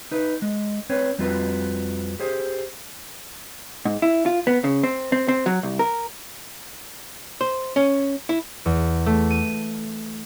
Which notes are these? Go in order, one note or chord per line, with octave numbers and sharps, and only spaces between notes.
D#4 B4
G#3
C4 C#4 B4 C#5
F2 G3 C4 F4 F#4 B4
G4 G#4 C5
G#2
E4
F4
B3
C#3
C4
C4
C4
F#3
C2
A#4
C5
C#4
E4
E2
A3
D#7